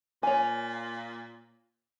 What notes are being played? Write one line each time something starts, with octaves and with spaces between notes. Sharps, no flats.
A#2 C#5 G#5